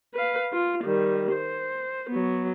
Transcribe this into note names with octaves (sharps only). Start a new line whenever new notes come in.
B4 F5
F4
D#3 G3
C5
F#3 B3